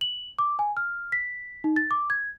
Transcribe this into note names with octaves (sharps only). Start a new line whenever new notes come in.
F#7
D6
G#5
F6
B6
D#4
A6
D6
G#6